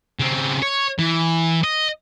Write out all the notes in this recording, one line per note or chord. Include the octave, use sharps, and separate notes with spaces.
C#3 C4
C#5
E3
D#5